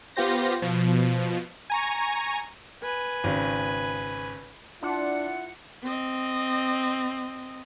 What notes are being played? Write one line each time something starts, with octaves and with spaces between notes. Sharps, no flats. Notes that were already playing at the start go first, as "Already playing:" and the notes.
B3 F4 G4 C5 A#6
B2 F3
G#5 A#5 C#6
B4 G#5
G#1 C#3
D4 E4 F4 F#5
C4 D#5